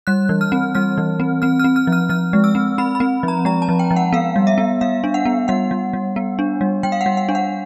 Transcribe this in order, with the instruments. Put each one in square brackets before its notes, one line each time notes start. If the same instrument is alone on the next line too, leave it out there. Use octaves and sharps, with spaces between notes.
[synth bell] G3 F#6
E3
F6
C4
G3 F6
E3
C4
C4 F6
F6
C4
F6
F3
F6
F3 F6
G#3
E6
C4
C4 B5
B5
C4
F3 A#5
G#3 A#5
A5
F3
G5
F3
F#5
B3 F5
G3
E5
B3
G3 F5
D4
F#5
B3
G3 F#5
G3
G3
B3
D4
G3
G3 G5
F5
F#5
G3
F#5
D4
F#5